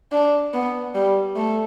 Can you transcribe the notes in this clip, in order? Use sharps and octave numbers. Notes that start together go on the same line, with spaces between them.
D4
B3
G3
A3